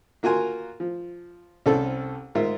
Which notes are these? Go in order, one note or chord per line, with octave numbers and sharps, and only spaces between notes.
A#3 F4 F#4 A#4 G#5 C6
F3
C2 C4 C#4 A4
G#2 F4 A#4 E5